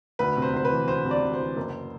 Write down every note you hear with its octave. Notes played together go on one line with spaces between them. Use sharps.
D2 B4
C3
C5
D2 C5
B4
E3
D2 C5
C3
D5
D2
C5
E3
F#1